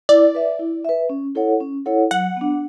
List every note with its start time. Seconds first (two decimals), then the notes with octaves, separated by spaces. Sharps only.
0.09 E4 D5
0.35 B4 E5
0.59 E4
0.85 B4 E5
1.09 C#4
1.35 E4 A4 C#5 F#5
1.60 C#4
1.86 E4 A4 C#5 F#5
2.11 F#3 F#5
2.37 B3 D4